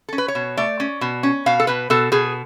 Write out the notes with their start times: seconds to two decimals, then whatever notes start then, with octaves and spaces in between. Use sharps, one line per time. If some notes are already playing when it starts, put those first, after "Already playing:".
0.09 C#4 A4
0.18 B4
0.28 C#5
0.35 B2
0.57 A3 D5
0.80 C#4
1.01 B2
1.23 C#4
1.46 B2 F5
1.60 A4
1.67 B2 B4
1.90 B2 A4
2.12 B2 G#4